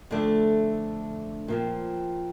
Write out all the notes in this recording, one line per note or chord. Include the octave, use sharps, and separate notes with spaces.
F2 D3 A3 D4
A#2 F3 C4